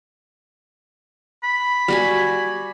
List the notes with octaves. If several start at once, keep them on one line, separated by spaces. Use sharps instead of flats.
B5
G3 F#4 G#5